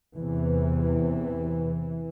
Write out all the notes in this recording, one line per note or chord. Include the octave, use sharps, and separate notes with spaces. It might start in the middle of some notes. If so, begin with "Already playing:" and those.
E2 C3 E3